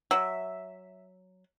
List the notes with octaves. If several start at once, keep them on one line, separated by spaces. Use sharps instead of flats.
F#3 E5